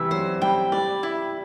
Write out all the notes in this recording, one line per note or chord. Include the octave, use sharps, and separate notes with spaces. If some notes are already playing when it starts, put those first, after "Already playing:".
Already playing: C3 E3 G3 E5
F#3 C5
G3 G5
G3 D5
E4